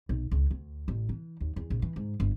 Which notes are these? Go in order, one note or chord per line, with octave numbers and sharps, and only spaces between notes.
B1
C#2
D2
A1
E3
D#2
E2
A#1
E3
G#2
G1